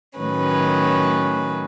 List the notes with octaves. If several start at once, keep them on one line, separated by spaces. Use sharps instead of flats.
A2 D#3 F#3 C#4 B4